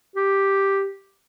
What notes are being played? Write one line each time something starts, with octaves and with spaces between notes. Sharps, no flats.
G4